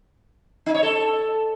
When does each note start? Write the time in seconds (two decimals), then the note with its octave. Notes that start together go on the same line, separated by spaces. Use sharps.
0.66 D#4
0.74 C#5
0.83 A4